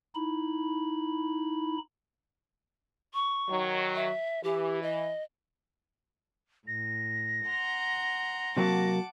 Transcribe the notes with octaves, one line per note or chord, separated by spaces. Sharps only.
D#4 E4 B5
C#6
D#3 F#3
E5
E3 G4
D#5
A2 A#6
F#5 A#5 C6
C3 F#3 A#3 F#5 A5 D6